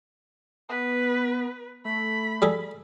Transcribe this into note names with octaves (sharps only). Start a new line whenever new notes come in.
B3 B4
A3 B5
G3 G#4 A4